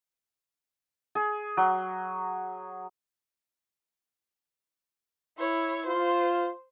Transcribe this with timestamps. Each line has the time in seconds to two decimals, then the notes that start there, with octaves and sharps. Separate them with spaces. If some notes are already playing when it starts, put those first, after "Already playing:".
1.15 G#4
1.57 F#3
5.38 E4 C#5
5.86 F4 C5